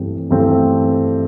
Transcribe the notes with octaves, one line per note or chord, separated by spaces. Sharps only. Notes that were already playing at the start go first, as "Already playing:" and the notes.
Already playing: G2 E3 A3 C4
G2 E3 A3 C4